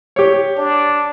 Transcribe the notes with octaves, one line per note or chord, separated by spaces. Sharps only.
G4 C#5
D4